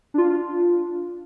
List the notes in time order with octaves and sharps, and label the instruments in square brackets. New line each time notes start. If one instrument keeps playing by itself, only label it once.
[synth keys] D4 F4